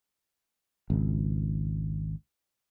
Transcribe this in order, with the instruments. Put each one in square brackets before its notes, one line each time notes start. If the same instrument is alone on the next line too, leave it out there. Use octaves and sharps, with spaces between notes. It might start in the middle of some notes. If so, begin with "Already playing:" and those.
[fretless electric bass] G#1 C#2